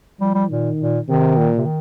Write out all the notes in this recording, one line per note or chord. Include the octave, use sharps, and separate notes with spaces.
F3 G3
G3
A#2 D#3
A#2
C3 D#3
A#2
C3
D#3